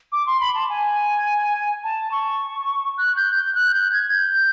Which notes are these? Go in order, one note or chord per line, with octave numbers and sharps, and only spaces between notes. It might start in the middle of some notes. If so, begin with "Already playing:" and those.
D6
C6
B5
A5
G#5
A5
C#6
F#6
G6
G6
F#6
G6
G#6
G6